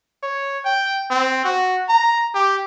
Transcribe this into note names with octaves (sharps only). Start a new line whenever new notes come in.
C#5
G5
C4
F#4
A#5
G4